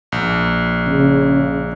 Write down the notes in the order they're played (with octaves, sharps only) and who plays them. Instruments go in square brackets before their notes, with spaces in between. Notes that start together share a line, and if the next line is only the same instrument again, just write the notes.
[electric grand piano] A#1
[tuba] C#3